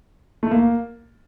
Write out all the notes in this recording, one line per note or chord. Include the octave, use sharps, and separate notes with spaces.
A3
A#3